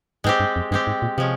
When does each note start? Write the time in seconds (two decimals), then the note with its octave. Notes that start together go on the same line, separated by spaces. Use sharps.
0.24 G#2 G#3 C4 G4
0.40 G2
0.56 F2
0.71 G2 G#3 C4 G4
0.87 G#2
1.02 A#2
1.18 C3 F3 G#3 C#4